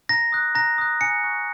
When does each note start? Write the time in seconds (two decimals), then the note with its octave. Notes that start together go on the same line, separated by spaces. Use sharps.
0.09 A#5 A#6
0.32 D#6 F#6
0.55 A#5 A#6
0.78 D#6 F#6
1.01 G#5 C#7
1.24 C#6 F#6